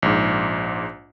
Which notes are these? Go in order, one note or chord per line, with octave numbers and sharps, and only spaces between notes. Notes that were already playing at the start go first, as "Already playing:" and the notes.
A#1 G#2